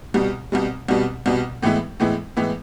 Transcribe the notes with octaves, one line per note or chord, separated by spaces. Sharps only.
C2 B2 G3
C2 B2 G3
C2 B2 G3
C2 B2 G3
A2 E3 G#3 B3 E4
A2 E3 G#3 B3 E4
A2 E3 G#3 B3 E4